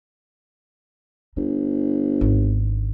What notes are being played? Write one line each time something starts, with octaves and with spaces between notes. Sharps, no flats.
G1 D#4
G#1